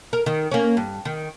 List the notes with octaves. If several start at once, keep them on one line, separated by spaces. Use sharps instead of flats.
A#4
D#3
A#3 C#4
G2
D#3